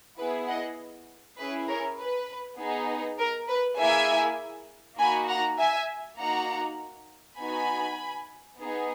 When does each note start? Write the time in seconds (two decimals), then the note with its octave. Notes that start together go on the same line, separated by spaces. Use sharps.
0.18 B3 E4 G#4 B4
0.48 D#5 F#5
1.38 C#4 E4 G#4 B4
1.68 A#4 C#5
1.98 B4
2.58 B3 D#4 G#4
3.19 A#4
3.49 B4
3.78 A#3 E4 G#4 E5 G#5
4.98 A#3 D#4 F#4 G#5 B5
5.29 F#5 A#5
5.58 E5 G#5
6.18 A#3 D#4 F#4 F#5 A#5
7.38 B3 D#4 F#4 G#5 B5
8.59 B3 D#4 G#4